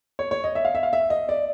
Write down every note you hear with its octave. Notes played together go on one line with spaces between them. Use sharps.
C#5
C#5
D#5
E5
F5
E5
F5
E5
D#5
D5